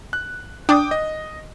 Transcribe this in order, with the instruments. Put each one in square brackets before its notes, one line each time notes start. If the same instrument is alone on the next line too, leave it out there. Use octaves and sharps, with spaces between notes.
[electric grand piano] F#6
[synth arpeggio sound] D4 [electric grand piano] G5 D6 D#6
[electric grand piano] D#5